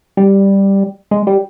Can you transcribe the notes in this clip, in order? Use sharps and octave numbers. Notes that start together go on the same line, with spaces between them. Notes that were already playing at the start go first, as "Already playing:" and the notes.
G3
G#3
G3